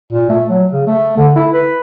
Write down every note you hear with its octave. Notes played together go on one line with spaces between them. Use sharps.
A#2
A3
F#3
C#3
A3
D3
E4
B4